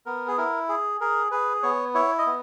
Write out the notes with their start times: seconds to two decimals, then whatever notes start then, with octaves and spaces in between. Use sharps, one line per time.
0.06 B3 A#4
0.28 G#4
0.38 E4 A#4
0.69 G#4
1.01 G#4 A#4
1.31 G#4 B4
1.63 B3 C#5
1.94 E4 C#5
2.18 D#5
2.26 B3